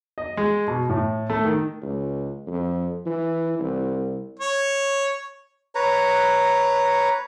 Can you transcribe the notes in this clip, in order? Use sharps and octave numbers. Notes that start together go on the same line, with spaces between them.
D#5
G#3
B2
A2
A3
D#3
C#2
F2
E3
C2
C#5
B4 C#5 A#5